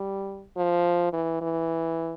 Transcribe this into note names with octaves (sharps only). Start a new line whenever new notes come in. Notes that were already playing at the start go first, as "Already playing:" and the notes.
Already playing: G3
F3
E3
E3